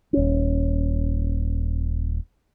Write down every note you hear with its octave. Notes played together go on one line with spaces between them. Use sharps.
D#1 C#4